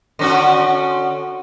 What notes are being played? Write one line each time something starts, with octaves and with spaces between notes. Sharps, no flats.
D3 C#4 F#4